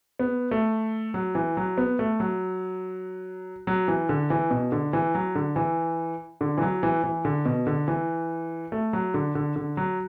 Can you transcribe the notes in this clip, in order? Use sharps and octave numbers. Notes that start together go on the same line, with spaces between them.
B3
A3
F#3
E3
F#3
B3
A3
F#3
F#3
E3
D3
E3
B2
D3
E3
F#3
D3
E3
D3
E3
F#3
E3
E3
D3
B2
D3
E3
A3
F#3
D3
D3
D3
F#3